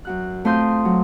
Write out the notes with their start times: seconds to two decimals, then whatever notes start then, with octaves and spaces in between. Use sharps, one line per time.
0.05 F#2 F#4 F#6
0.45 A3 C4 F4 C6 D#6 G6
0.85 F#3